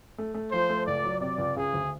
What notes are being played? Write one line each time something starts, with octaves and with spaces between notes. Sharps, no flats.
A3
A3
F3 C5
A3
C#2 D5
F#3
C3 D5
C#2
C#3 G#4
D2